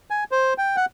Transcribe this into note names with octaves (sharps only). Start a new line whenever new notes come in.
G#5
C5
G5
F#5